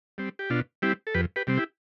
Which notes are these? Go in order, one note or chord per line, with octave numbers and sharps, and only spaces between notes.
G3 C4
G4
B2 D4 F4
G3 C4 E4 G4
A4
F2 G4 B4
G4 B4
C3 G3 C4
E4 G4